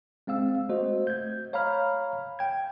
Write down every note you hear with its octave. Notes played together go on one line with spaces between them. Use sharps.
G#3 C4 F5 E6
A3 F#4 C5 D#5
G6 G#6
C#5 F5 A#5 B5 F6
G5 G#6